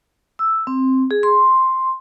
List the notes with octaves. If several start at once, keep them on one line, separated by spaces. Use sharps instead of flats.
E6
C4
G#4
C6